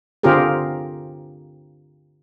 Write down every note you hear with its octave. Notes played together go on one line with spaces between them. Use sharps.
D3 C4 F4 G4 G#4 A#4